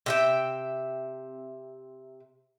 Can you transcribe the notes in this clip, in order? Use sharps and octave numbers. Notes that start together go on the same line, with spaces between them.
C3 E5 G5